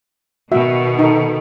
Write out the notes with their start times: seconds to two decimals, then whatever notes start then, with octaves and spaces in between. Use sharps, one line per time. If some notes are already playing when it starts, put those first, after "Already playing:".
0.52 B2 D#3 F#4 E5
0.99 D#4 A4